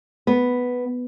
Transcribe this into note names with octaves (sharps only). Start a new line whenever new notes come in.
B3